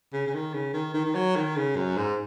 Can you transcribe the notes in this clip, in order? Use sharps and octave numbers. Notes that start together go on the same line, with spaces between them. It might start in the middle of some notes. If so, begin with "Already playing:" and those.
C#3
C#3
D#3
C#3
D#3
D#3
D#3
F#3
D#3
C#3
F#2
G#2